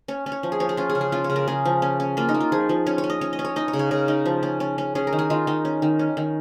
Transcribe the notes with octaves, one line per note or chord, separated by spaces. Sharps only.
C#4 C#5
C#4
C#5
F3
G#4
F3 C#5
G#4
C#4 F4
G#4
C#3
G#4
C#4 F4
C#5
C#3
A#4
C#4 G#4
F3
C#4
C#4
A#3 F4
D#4
A#3
F4
F3 G#4
F3
C#4 C#5
C#5
C#4
D#5
C#4 C#5
D#5
C#4
C#5
D#4 D#5
C#5
C#3
C#5
C#3 A#4
D#4
F3
C#4
C#4
C#4
C#4 G#4
A#4
D#3
G#4
D#3 F4
D#3 D#4
C#4
D#3
C#4
D#3